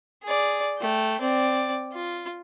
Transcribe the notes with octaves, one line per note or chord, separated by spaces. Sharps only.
G#4 D5
A3 G5
C4 D5
F4